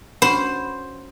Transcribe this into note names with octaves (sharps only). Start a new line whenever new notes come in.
C#4 F#4 C5 B5